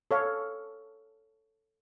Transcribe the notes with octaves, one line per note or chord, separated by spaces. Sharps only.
A4 C#5 F5